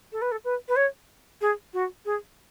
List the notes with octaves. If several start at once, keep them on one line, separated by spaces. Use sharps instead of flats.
A4
B4
A4
B4
B4
C#5
G#4
F#4
G#4